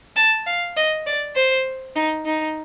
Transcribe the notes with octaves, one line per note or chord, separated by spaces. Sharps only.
A5
F5
D#5
D5
C5
D#4
D#4